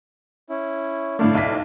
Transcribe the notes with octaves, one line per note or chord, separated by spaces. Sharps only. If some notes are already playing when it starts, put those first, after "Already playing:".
C#4 E4
A2 D3 A3 E4 D5 F5
B1 B6